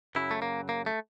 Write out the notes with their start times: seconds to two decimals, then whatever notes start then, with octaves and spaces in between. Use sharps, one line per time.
0.15 F#2 C#3 F#3 E4
0.31 A3
0.42 A#3
0.69 A#3
0.86 A3